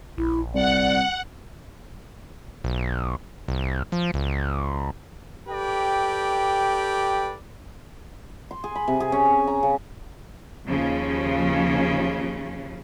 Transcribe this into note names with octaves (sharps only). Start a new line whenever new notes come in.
A#1 E4
C2 D5 F#5
B1
C2
F3
C#2
G4 A4 B4 D5 G5
C6
G#4
B5
C3
G#4
C#4
G#5
A#5
C#3
D#2 C#3 F3 C#4